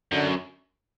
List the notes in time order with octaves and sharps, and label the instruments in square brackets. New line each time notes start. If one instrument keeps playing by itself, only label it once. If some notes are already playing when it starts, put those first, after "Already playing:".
[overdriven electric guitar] F#2 [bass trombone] D3